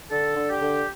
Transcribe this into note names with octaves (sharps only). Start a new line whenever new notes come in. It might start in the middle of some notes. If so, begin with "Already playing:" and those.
D3 A4
D3
G4
D3